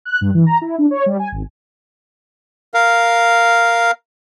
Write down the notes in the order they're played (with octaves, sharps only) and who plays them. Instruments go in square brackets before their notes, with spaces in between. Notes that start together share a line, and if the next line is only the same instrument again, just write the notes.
[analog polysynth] F#6
G2
E3
A#5
E4
D4
C#5
G3
G#5
G#1
[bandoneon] A#4 F5